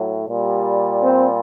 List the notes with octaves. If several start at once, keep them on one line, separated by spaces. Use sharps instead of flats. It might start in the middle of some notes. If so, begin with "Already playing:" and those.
Already playing: A2 F#3
A#2 G3
C4